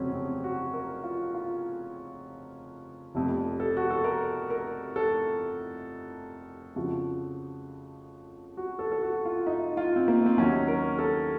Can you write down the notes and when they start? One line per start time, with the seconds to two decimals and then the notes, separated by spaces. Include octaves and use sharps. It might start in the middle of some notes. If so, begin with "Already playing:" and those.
Already playing: F1 F2 C#3 F#3 C4 C#4
0.13 C4
0.44 F#4
0.73 A#4
1.03 F4
1.34 F4
3.15 F1 F2 C3
3.60 A4
3.77 F#4
3.91 A4
4.04 A#4
4.50 A#4
4.96 A4
6.76 F2 C#3 F3 F#4
8.57 F#4
8.79 A4
8.92 A4
9.02 F#4
9.25 F4
9.47 D#4
9.77 F4
9.96 C4
10.08 A#3
10.26 C4
10.38 D#2 D#3 F#3 C#4
10.68 A#4
10.99 A4